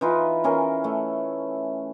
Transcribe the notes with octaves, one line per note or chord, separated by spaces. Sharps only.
E3 D#4 F4 B4
E3 C#4 G#4 A#4
A3